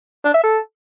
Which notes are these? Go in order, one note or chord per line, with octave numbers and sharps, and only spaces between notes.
D4
E5
A4